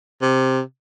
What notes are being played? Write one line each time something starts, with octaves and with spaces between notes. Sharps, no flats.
C3